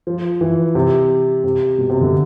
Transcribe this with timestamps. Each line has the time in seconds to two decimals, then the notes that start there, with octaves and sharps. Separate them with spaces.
0.07 F3
0.41 E3
0.75 C3
1.44 C3
1.78 B2
1.90 C3
2.01 D3